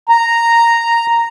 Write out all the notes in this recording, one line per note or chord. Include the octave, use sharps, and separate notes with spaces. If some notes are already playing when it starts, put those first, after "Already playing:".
A#5